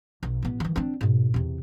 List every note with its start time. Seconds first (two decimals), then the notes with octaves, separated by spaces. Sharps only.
0.23 B1
0.42 A1 B3
0.60 D#3 E3
0.76 C4 D4
1.01 G#2 B2
1.34 E2 C3